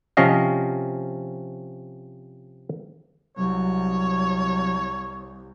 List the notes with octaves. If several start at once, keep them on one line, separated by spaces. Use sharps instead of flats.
C3 F3 C#4 D#5 F5
C2 F#3 C#5